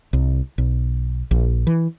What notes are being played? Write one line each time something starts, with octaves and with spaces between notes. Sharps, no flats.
C2
B1
A#1
E3